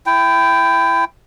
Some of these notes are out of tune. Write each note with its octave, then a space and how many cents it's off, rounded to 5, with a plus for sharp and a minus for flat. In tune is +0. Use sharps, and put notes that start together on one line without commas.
E4 +25 G5 +0